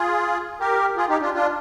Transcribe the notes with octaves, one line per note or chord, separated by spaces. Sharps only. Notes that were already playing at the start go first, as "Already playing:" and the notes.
Already playing: F4 G#4
G4 A#4
F4 G#4
D#4 G4
D4 F4
D4 F4